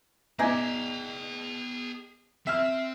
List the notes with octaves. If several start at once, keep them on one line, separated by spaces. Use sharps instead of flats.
B2 D#4 G#4 D5 G5 G#5
C4 E5 F6